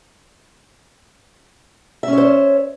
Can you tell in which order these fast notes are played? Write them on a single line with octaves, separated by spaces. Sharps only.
E5 C#4 C#5 C5